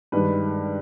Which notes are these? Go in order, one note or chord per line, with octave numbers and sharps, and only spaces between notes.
G2 D#3 G#3 B4